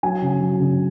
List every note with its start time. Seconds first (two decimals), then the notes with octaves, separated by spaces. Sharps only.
0.03 F#3 G#5
0.22 C#3
0.41 F#3
0.60 C#3